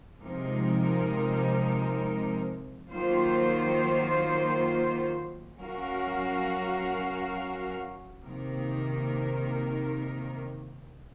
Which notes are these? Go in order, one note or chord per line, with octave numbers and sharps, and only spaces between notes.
C3 F3 G#3 D#4 A#4
D#3 F#3 A#3 F4 C5
F#3 C#4 F#4 A#4 F5
C3 D#3 A#3 D#4 A#4